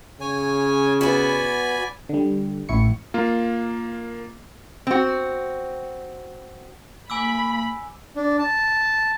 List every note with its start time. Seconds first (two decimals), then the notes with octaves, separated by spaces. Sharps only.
0.21 C#3 C#5 G#5
1.01 B3 F#4 D5 G#5 B5
2.09 D3 G3
2.69 A1 E4 C#6 C#7
3.14 A#3 F4
4.87 C4 F#4
7.10 A#3 G#5 B5 D6 E6
8.16 D4
8.39 A5